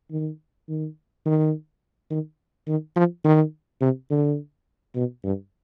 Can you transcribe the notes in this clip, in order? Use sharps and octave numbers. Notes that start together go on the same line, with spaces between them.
D#3
D#3
D#3
D#3
D#3
F3
D#3
C3
D3
B2
G2